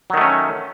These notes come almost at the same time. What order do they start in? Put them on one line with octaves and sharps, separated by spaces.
F#3 D#3 A3 C#4